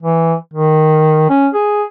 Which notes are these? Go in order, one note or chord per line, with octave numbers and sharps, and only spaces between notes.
E3
D#3
C#4
G#4